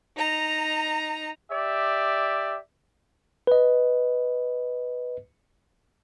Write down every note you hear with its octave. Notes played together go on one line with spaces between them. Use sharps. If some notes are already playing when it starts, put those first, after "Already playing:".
D#4 A#5
G4 D5 E5
B4 D#5